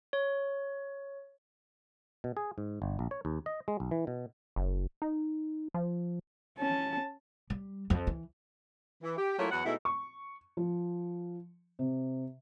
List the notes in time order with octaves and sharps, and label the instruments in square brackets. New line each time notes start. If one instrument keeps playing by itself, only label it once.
[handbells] C#5
[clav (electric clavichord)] B2
G#4
G#2
G1
A#1
C#5
D#2
D#5
G#3
B1
E3
B2
[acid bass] F#1
D#4
F3
[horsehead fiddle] C#4 A5
[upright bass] G3
F2
E3
[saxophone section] E3
G4
F#3 A3 A#3 E4 F4 C#5
E2 F#3 B3 F#5
B2 G#3 A3 D#4 E4
[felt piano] C#6
F3
C3